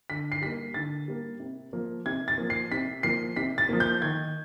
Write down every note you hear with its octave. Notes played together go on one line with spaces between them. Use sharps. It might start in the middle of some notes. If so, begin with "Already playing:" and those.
D3 B6
C7
G3 A#3 B6
D3 A6
G3 A#3
C3
F3 A#3
C3 G#6
A6
F3 A#3
C7
C3 B6
F3 A#3 C7
C3 B6
A6
F3 A#3
G6
D#3 G#6